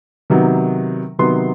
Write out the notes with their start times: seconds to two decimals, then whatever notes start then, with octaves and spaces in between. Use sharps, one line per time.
0.30 C3 D#3 F#3 B3
1.19 C3 D#3 F#3 B3 C6